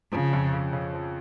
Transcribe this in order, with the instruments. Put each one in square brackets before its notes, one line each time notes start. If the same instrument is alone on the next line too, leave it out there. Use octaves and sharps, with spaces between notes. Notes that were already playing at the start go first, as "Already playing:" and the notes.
[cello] C#3 [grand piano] F3
[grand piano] F2
C#3
C#3
F3